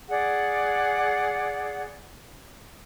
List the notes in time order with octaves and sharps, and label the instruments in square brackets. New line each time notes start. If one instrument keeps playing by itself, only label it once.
[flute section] G#4 D5 F#5